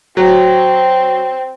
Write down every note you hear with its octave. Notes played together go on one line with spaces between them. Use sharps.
F#3 C4